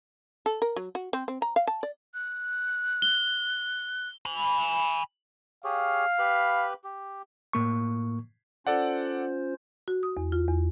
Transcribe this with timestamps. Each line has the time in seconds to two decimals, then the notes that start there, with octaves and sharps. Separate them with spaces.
0.46 A4
0.62 A#4
0.76 F#3
0.95 F#4
1.13 C4
1.28 C4
1.42 A#5
1.56 F5
1.67 A5
1.83 D5
2.14 F#6
3.02 G7
4.26 G#5 B5
5.64 G4 G#4 C#5 F5
6.19 G4 B4 B5
6.84 G4
7.53 A2 A#3 C#6
8.67 C#4 F4 A4 C5 D5 F#5
9.88 F#4
10.03 D#6
10.17 E2
10.32 F4
10.48 E2